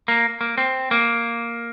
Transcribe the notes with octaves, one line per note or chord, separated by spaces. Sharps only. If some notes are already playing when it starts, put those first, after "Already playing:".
A#3
A#3
C4
A#3